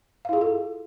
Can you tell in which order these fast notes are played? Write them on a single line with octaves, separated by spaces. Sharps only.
F5 E4 G#4 F4 A4